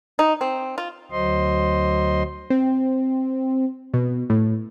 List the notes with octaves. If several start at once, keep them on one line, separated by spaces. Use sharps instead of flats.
D#4
C4
F4
D2 F#3 C5 D#5 C6
C4
B2
A2